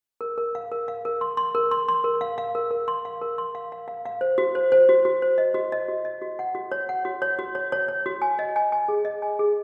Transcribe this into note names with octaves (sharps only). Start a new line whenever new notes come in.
A#4
A#4
F5
A#4
F5
A#4
C6
C6
A#4
C6
C6
A#4
F5
F5
A#4
A#4
C6
F5
A#4
C6
F5
F5
F5
F5
C5
F#4
C5
C5
F#4
F#4
C5
D#5
F#4
D#5
F#4
D#5
F#4
F#5
F#4
C#5
F#5
F#4
C#5
F#4
C#5
C#5
C#5
F#4
G#5
D#5
G#5
G#5
G#4
D#5
G#5
G#4